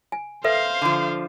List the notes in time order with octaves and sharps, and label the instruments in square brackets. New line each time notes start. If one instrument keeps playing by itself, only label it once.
[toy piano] G#5
[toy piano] A4 B4 E5 [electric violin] C5 F5
[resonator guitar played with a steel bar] D3 F3